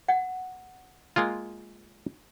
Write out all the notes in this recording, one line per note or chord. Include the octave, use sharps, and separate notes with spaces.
F#5
G#3 A#3 F4